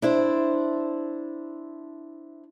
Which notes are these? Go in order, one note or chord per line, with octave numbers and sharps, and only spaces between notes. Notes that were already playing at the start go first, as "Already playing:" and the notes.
D4 E4 C5